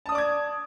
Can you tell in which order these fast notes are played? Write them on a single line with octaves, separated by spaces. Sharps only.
A5 D#6 D5 D6 G#6